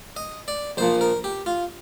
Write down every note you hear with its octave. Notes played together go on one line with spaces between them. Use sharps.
D#5
D5
A#1 A#2 F3 C5
A#4
G4
F4